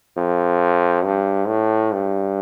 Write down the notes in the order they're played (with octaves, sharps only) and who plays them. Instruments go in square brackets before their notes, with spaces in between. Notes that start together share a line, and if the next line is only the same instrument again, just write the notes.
[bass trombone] F2
G2
A2
G2